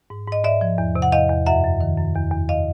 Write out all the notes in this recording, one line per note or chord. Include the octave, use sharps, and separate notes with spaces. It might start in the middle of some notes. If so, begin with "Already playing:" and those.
G#2
G#2 D#5
G#2 D5 E5
F3
E2
C3
F#5
E2 D#5 F5
E2
F#2 E5 F#5
F#2
D#3
F#2
E2
E2
D#5 F5